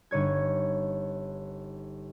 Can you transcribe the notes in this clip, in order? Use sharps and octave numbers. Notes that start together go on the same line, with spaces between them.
G1 D#4 C#5 G#6